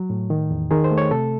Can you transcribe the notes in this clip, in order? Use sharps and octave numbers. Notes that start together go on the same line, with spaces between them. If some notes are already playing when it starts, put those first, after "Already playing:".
Already playing: F#3
A2
D#3
E2
D#3 G#4
C5
A3
C#5
C3 A4